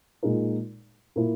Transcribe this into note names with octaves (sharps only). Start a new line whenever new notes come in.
A#2 G#3 D#4 A#4
A#2 A#3 E4 A#4